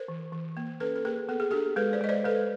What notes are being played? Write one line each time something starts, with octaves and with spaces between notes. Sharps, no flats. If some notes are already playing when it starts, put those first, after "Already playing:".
Already playing: A#4 C5
E3
E3
A#3
C#4 A4 B4
A4
A#3 G#4 A#4
B3 A4
G#4
D4 G4 A4
G#3 A4 B4
C5 D5
G#3 D#5
C5 D5
G#3 A4 B4